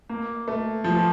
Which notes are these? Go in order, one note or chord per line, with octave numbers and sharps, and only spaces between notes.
A#3
A3
F3